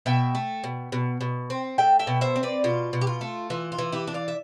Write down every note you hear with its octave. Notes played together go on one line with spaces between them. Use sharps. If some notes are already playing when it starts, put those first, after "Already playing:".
B2 E5 G5
A3
B2
B2
B2
C4
A3 E5 G5
E5 G5
B2
C5 E5
C4
B4 D5
B2 F4
B2
G4
F4
A3
E3 F4
F4
E3
E4 G4
D4
D5 F5
E5